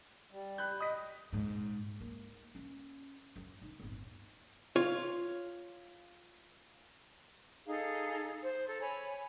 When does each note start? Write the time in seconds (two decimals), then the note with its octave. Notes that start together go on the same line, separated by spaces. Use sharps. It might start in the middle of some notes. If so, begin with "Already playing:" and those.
0.31 G3
0.58 B5 F#6 G6
0.81 D#5 D#6 B6
1.33 D#1 G#2
2.01 A#3
2.55 C#4
3.36 F#2 F#3
3.62 D#4
3.80 D1 G1
4.76 F4 C#5
7.67 D#4 G#4 A4 F5
8.42 C5
8.67 A4 A#5
8.81 C#5 G#5 B5